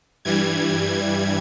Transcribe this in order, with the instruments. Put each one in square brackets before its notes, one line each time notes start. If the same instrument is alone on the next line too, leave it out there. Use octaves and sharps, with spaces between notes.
[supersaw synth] G2 E3 G3 G#6